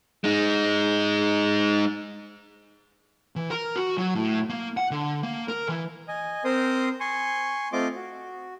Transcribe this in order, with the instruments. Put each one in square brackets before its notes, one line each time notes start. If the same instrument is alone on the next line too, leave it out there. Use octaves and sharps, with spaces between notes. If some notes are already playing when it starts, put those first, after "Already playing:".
[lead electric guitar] G#3 D#4
E3
A#4
F#4
F#3
A2
A#3
F#5
D3
A#3
A#4
E3
[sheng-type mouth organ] D#5 G#5
C4 A#4 C5 C6 D#6
G#5 C6 C#6
A3 C4 F4 D#5 C6 D6
F#4